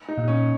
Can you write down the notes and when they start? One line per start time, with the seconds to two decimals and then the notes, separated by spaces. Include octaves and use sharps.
0.08 D#4
0.18 A#2
0.28 C#4